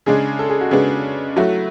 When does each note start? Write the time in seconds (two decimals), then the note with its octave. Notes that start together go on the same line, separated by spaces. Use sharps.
0.06 C#3 G#3 D4 G#4
0.39 A4
0.49 G#4
0.61 F#4
0.71 C#3 G#3 B3 D4 G#4
1.36 F#3 A3 E4 F#4